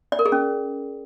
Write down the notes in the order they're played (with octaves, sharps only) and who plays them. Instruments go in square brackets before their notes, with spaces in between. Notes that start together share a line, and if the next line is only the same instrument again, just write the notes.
[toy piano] D5
A#4
G#4
C#4